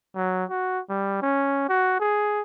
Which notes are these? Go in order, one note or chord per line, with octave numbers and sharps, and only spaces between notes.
F#3
F#4
G3
C#4
F#4
G#4